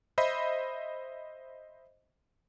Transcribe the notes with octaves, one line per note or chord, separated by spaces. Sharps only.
C5 D#5 E5 B5